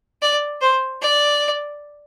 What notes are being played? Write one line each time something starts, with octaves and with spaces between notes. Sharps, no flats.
D5
C5
D5